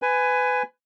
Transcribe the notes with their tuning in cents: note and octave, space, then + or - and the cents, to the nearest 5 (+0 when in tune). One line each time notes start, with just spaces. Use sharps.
B4 +25 G#5 +0